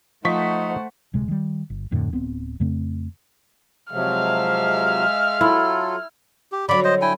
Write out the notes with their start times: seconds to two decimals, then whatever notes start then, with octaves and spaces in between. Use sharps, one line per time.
0.25 F3 A3 D#4 C5 F#5 C#6 B6
1.13 D1 C3 G#3
1.28 D#3 G3
1.70 G1
1.91 D1 F2 A2 D3
2.12 D1 B3 C4
2.60 F2 C#3 A3 C4
3.92 C3 F3 F#3 G#3 E5 F5 F6
5.41 F#3 E4 F4 A4
6.52 G4
6.69 D3 F#3 D5 B5
6.84 C5 D#5
7.02 E4 G5 G#5